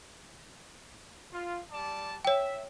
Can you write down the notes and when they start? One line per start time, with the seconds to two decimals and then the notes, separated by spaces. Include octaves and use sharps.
1.32 F4
1.71 G3 D5 A5
2.25 C#5 E5 G5